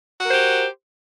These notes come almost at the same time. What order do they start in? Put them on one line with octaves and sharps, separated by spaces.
F#4 A#4 C5 G4